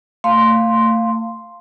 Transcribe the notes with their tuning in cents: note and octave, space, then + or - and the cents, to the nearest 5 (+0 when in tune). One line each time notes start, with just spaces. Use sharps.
A3 +35 F5 +0 C6 +0